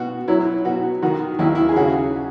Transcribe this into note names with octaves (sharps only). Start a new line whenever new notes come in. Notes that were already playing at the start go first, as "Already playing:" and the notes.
Already playing: B2 F#4
F#3 E4
B2 F#4
D#3 F#4
D#2 E4
E4
G#4
C#3 F#4